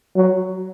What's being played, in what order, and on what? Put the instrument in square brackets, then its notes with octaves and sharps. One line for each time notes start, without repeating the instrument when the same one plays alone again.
[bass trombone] F#3